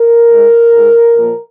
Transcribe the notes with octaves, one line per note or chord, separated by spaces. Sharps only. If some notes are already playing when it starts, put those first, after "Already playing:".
Already playing: A#4
G#2 G#3
G#2 G#3
A#2 F3 A#3